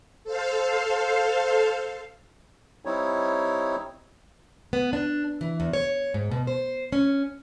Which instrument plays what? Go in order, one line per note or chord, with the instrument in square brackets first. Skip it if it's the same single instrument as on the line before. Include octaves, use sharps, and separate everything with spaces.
[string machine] A4 C5 F5
[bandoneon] G3 C4 D#4 E4 C#5
[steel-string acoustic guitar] B3
D4
E3
E2
C#5
G#2
B2
C5
C#4